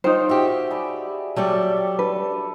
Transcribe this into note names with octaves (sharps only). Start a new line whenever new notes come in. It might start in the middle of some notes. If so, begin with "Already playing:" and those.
D#4 F4 C5 C#5 G5
F#4 G4 E5
G#4 D5 B5
F#3 G3 G4 A4 D5 G5
D4 B4